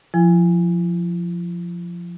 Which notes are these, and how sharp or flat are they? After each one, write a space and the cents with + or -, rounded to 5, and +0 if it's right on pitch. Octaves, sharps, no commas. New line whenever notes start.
F3 +0 E4 +30 G#5 -15